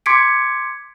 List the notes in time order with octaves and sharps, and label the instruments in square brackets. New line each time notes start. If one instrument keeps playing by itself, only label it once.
[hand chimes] C6 D6 G#6 B6 C#7 D7